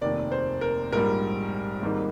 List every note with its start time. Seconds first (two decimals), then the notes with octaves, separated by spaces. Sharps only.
0.01 F1 D#2 D#3 D5
0.32 C5
0.61 A#4
0.92 A#1 G#2 G3 A#4
1.82 G#1 G#2 G3 A#3 D#4